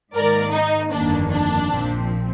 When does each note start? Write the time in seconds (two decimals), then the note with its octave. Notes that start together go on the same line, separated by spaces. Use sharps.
0.14 G#2 D#3 A#3 A#4 D5
0.53 D#4
0.92 G1 F2 D#3 A#3 D4
1.30 D4
1.68 A#1 A#2 F3 C4